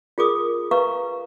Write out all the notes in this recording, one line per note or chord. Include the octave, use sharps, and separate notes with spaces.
F4 G#4 A#4 D6 D#6
B4 F5 A#5 C#6